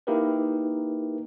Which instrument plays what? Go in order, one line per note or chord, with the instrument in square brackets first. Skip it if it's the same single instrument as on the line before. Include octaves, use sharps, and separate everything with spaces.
[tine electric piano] A#3 D#4 E4 G4 A#4 B4